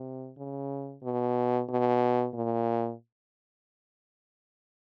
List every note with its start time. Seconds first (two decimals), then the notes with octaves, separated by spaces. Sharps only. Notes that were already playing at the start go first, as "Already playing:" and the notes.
Already playing: C3
0.38 C#3
1.03 B2
1.69 B2
2.34 A#2